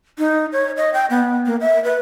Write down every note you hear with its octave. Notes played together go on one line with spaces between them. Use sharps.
D#4
C#5
D#5
G5
B3
A#3
E5
B4